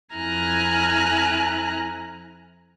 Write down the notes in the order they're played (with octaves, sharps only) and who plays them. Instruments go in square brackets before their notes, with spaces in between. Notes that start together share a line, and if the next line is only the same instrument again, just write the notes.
[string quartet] F2 E4 G#5 A#5 F6 F#6